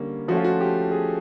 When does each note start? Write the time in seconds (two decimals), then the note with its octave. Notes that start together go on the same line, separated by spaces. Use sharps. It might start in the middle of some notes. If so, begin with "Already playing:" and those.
Already playing: D3 G3 A#3 C#4
0.28 F3 A3 C#4 F#4
0.37 F4
0.44 F#4
0.60 G4
0.91 G#4